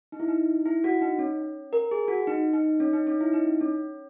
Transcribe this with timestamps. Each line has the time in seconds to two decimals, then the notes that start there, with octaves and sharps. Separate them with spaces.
0.12 D#4
0.20 E4
0.28 D#4
0.66 E4
0.84 F#4
1.01 D#4
1.19 C#4
1.73 A#4
1.91 G#4
2.08 F#4
2.27 D#4
2.53 D#4
2.80 C#4
2.93 D#4
3.07 C#4
3.21 E4
3.33 D#4
3.61 C#4